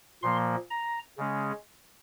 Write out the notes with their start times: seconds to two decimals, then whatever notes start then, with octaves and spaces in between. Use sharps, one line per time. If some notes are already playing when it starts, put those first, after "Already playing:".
0.22 A#2 F3 A#3 C6
0.70 A#5
1.18 C#3 G#3 C#4